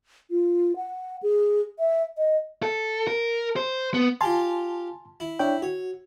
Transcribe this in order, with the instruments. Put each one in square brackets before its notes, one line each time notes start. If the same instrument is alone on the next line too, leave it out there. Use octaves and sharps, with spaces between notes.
[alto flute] F4
F#5
G#4
E5
D#5
[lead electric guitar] A4
A#4
C5
B3
[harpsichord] F4 G4 F5 [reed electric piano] G#5 A5 C6
[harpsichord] E4
[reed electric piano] D4 C#5 G5 [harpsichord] E4
[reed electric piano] F#4 [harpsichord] C#5